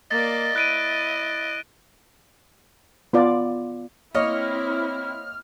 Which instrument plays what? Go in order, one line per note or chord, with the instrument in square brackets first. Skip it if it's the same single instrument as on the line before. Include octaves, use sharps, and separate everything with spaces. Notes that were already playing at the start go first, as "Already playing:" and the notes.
[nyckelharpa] A#3 D5 [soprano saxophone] D#5 [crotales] A6
[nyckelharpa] E4 [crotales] F#6 D7 D#7
[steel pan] B3 F4 D5
[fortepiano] A#3 D#5 [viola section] C4 E4 [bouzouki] C#5 [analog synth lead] F6